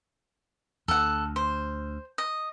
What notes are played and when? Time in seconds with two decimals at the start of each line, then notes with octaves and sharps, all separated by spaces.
0.88 D2 A4 F#5
1.36 C5
2.18 D#5